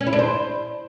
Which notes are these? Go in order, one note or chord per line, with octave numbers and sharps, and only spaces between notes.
C#4
E4
D4
C5